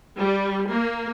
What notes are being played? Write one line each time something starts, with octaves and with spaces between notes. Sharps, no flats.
G3
A#3